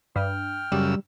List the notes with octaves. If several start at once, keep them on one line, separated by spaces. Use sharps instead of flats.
G2 G5 F6
F#2 C#3 G3 E6